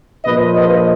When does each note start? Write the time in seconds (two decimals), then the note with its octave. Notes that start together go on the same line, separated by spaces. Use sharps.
0.25 A#1 A#2 F3 B4 D#5
0.57 B4 D#5